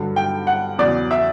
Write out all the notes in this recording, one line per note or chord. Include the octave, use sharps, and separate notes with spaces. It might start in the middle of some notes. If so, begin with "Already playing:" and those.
Already playing: G2 D3 F#3
G5
F#5
E2 C#3 F#3 D5
E5